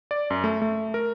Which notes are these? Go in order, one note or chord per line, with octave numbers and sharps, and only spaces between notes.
D5
F#2
A3
A3
A#4